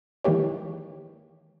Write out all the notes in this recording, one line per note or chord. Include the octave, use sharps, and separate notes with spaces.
D#3 E3 G#3 A#3 G4 C#5